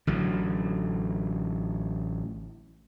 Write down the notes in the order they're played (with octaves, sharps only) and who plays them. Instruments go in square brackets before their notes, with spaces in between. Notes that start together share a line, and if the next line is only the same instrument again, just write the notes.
[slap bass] A1 D3 F#3